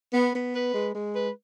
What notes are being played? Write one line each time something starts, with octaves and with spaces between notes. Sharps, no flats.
B3
B3
B4
G#3
G#3
B4